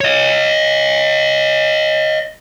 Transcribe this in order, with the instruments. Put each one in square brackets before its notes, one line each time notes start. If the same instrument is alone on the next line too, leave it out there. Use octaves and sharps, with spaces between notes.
[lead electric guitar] C#5 D#5